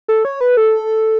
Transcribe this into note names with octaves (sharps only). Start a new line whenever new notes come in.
A4
C#5
B4
A4